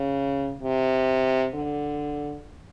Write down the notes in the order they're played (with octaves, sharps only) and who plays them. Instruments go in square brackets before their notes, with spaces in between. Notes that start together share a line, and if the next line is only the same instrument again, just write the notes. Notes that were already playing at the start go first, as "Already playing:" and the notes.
Already playing: [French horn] C#3
C3
D3